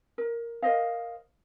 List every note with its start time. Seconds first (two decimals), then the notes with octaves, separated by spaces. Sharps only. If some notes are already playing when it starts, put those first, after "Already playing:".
0.18 A#4
0.62 A#4 C5 D#5 F5